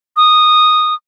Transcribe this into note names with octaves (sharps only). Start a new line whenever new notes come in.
D#6